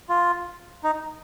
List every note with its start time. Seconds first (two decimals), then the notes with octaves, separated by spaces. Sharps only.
0.09 F4
0.84 D#4